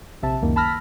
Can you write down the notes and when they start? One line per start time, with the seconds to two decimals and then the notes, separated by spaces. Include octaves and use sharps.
0.22 A#1 C3 E5 A5
0.42 C#2 F#2 D#3 A#3
0.56 A5 B5 E6 F6 A#6 B6